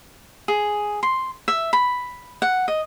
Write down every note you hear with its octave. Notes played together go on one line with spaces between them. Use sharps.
G#4
C6
E5
B5
F#5
D#5